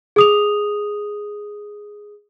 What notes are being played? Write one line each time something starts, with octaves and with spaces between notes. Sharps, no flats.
G#4 D#6 F7